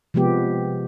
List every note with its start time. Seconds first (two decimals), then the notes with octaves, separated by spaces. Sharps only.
0.14 C3 F3 G#3 B3 G4